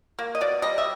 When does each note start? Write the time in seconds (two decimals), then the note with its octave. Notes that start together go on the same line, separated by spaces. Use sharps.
0.19 A#3
0.35 D#5
0.41 B2 D5
0.62 G3 D#5
0.78 E5